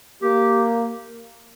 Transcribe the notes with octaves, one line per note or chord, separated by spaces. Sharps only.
A#3 G4